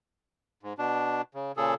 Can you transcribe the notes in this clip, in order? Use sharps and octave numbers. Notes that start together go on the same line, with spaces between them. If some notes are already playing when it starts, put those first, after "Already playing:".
G#2
B2 D4
C#3
A#2 C#3 G#4 A4